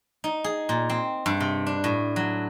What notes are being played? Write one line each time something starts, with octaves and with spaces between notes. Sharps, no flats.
D#4
G#4
A#2
C4
G2
C3
D4
A2
F#3